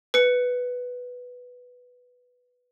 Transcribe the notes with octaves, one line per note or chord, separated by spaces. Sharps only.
B4 C#7